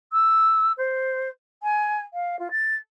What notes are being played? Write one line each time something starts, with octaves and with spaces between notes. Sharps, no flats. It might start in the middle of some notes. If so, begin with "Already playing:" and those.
E6
C5
G#5
F5
F4
A6